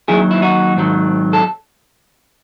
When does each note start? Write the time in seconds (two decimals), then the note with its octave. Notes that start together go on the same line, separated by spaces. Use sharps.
0.08 D#2 D#3 F#3 E4 G#4
0.31 E4
0.42 D#4 F#4
0.77 G#2 D#3 F#3
1.33 A4